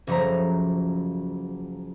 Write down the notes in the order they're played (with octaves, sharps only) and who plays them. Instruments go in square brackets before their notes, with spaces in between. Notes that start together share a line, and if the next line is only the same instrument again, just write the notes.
[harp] F#1 F3 F#3 A3 A#5